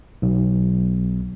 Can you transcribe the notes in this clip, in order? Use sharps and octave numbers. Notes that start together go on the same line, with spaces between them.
B1